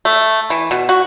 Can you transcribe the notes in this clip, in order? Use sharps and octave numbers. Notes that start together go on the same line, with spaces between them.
A3
E3
B2
F#4